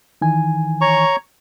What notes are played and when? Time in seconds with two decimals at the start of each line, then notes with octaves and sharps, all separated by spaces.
0.22 D#3 E3 G#5
0.81 C#5 A#5 C#6